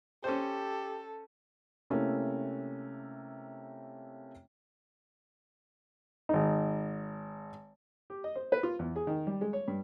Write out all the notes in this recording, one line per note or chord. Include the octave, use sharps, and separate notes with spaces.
C#4 G4 A4 C5
C3 A3 A#3 C#4 E4
G#1 D#4
G4
D#5
C5
B4
F4
E2
G#4
D#3
G3
G#3
C#5
G2